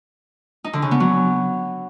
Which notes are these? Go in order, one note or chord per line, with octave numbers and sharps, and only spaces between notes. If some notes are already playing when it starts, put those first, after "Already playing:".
D#4
D3
C#3
B3
F#3